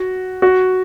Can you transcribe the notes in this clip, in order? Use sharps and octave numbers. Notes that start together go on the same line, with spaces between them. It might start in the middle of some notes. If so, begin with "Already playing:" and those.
Already playing: F#4
F#4